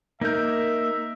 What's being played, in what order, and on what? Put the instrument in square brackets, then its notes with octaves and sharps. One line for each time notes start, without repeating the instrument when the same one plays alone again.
[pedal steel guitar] A#3 G6 [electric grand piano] D#4 A#4 [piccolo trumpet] E5